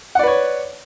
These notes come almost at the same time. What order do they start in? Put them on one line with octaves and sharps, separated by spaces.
F#5 D5 B4 C#5